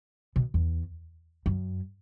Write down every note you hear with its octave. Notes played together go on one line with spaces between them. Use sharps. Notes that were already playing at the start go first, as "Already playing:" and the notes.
B2
E2
F#2